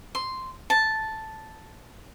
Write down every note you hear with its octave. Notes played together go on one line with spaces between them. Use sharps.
C6
A5